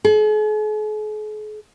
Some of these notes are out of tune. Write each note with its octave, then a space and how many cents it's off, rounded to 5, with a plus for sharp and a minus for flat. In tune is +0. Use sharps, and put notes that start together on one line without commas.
G#4 +45